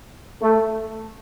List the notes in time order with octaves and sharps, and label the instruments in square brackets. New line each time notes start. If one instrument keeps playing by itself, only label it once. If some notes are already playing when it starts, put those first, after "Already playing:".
[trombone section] A3